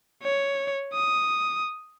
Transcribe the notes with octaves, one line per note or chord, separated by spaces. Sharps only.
C#5
D#6